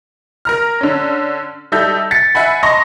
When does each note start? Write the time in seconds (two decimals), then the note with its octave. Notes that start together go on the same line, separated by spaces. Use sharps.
0.45 A#4 A#5 F6
0.81 D3 C#4
1.72 G3 D#4 A4 E5 G6
2.11 A6 B6 C#7
2.35 E5 F#5 G#5 B5
2.63 D#5 A5 A#5 C6 C#6 A#6